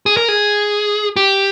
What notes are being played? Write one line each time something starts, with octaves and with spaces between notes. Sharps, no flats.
G#4
A#4
G#4
G4